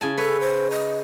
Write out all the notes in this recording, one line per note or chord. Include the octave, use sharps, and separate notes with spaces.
C#3 E4 G#5 A5
A4 B4 C#5 G#5
C5
D#5